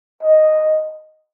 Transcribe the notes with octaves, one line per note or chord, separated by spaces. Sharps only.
D#5